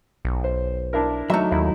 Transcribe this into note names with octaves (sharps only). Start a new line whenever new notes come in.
B1
C5
D4 E4 A#4
F#3 A3 D#4 E5
D#2 E4